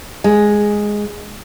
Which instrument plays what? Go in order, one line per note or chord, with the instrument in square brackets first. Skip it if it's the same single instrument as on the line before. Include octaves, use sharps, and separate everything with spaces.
[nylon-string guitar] G#3